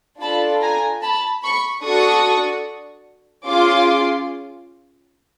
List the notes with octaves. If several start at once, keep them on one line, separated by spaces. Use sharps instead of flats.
D4 F4 A4 A5 B5
G#5 A#5
A5 B5
B5 C#6
D4 F#4 A4 C#6 D#6
C#4 F4 G#4 C6 D6